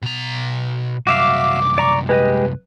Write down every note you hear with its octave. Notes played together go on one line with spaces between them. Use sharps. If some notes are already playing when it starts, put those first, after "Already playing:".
B2 A#5
C2 F#2 F#4 E5 F5 D6
D5 A#5 C#6
G#3 G4 B4 D#5